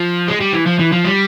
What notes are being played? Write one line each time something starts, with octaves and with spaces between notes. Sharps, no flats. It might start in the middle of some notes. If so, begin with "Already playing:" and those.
Already playing: F3
G#3
G3
E3
F3
E3
F3
G3